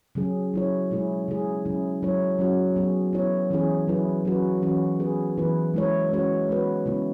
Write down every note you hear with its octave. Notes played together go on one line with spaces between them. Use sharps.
C#3 F#3 C#4 G#4
F#3 E4 C#5
B2 G#3 E4 G#4
C#3 G#3 E4 G#4
C#3 F#3 C#4 E4
F#3 E4 C#5
F#3 C#4 F#4 C#5
F#3 B3 G#4
B3 E4 C#5
E3 C#4 E4 G#4
F#3 E4 B4
F#3 C#4 F#4 B4
E3 C#4 F#4
B3 G#4 B4
E3 B3 E4 B4
G#3 E4 C#5
G#3 C#4 F#4 C#5
G#3 B3 F#4 B4
C#3 G#3 B3 E4